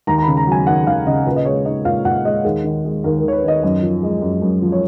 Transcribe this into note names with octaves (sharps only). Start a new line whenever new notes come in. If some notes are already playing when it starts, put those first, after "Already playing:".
D#2 A#5
A#5
B5
C#3
A#5
F#3 G#5
D#2 F#5
D#2 F5
C#3 D#5
A#2 B4
D#5
G#3 C#5
D#4 D#5
A#2 F5
A#2 F#5
G#3 D#5
D#2 G#4
D#3
G#3
D#2 A#4
A#4
D#2 C#5
B4
D#3 D#5
F#2 D#5
F3
G#3
F#2
F#2
F3
C#5